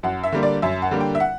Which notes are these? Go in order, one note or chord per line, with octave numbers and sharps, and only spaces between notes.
F#2 F#5
E5
D3 G3 A#3
D5
F#2 E5
F#5
D3 G3 A#3
G5
E5
F#5